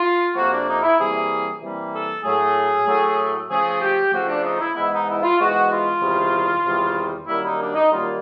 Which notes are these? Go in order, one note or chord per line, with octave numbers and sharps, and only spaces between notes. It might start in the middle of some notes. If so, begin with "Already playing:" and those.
Already playing: F4
F2 C3 F3 A#3 F#4
D4
D#4
E4
C3 E3 G3 A#3 G#4
C3 E3 G3 A#3
A4
A2 F#3 A3 G#4
A2 F#3 A3
C#3 F3 A3 G#4
G4
C#3 F3 A3 F#4
D4
D#4
E4
G#2 E3 G#3 B3 E4
D#4
E4
F4
G#2 E3 G#3 B3 F#4
F4
E2 C3 D#3 G3
E2 C3 D#3 G3
F#2 D#3 G3 A#3 E4
D#4
D4
D#4
F#2 D#3 G3 A#3 F4